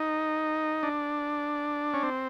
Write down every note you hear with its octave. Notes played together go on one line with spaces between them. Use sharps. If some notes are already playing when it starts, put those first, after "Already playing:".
Already playing: D#4
D4
C#4
C4